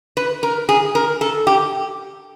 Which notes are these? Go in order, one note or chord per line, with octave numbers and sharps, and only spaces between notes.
B4
A#4
G#4
A#4
A4
G4